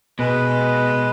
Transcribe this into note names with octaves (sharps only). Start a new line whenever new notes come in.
B2 G#3 B4